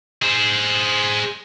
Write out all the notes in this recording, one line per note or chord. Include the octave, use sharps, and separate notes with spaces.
G#4 C5